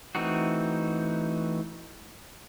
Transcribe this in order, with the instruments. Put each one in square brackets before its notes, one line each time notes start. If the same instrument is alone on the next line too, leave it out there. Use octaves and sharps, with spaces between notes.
[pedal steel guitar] E3 A3 C4 D#4 F#4